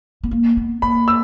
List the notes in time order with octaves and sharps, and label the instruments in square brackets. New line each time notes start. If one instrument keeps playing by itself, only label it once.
[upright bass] B3
A#3
B3
[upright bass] A#3 [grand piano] B5
[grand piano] E6